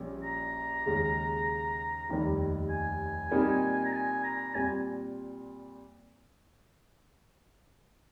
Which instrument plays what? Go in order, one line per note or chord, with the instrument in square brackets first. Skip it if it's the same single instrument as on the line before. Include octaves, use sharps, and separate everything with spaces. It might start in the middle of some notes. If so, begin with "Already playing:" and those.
Already playing: [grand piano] A#1 A#2 G3 C#4 G4
[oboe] A#5
[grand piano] D#2 C#3 G#3
F1 D#2 D#3 G3
[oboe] G#5
[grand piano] A#2 G3 C4 D#4 A#4
[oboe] A#5
G#5
A#5
[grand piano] A#2 G3 C4 [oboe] G#5